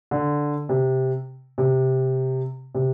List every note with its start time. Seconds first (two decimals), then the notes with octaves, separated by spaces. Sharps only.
0.11 D3
0.69 C3
1.58 C3
2.75 C3